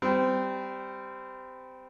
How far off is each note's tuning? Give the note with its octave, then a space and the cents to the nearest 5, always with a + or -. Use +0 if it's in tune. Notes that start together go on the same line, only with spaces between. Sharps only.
G3 +0 C4 -25